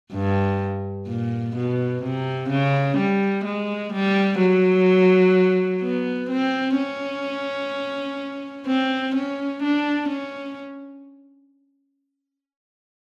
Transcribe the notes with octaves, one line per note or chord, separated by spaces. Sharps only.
G2
A#2
B2
C3
C#3
G3
G#3
G3
F#3
B3
C4
C#4
C4
C#4
D4
C#4